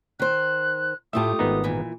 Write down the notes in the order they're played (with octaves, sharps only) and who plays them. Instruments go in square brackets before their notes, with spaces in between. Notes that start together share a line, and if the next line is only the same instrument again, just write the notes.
[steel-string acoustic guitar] D#3 C5 [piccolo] F#6
[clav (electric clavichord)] A2 E5 [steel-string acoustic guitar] A3 F4 G4 [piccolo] D#6
[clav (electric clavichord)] G#1 B3 D#4
[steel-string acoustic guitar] A#2 E3